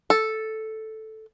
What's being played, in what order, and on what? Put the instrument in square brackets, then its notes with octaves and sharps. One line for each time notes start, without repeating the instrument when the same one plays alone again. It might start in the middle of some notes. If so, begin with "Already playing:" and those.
[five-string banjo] A4